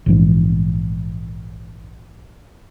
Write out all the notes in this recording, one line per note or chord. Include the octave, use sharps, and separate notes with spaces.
A#1 G#2 E3